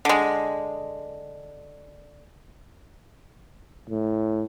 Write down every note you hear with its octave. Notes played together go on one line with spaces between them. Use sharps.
D3 G#3
A2